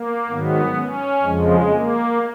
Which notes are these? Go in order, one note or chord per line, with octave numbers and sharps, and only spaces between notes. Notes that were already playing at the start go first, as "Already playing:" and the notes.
Already playing: A#3
G#2 D#3 F#3 B3
C#4
F2 C#3 F3 G#3
A#3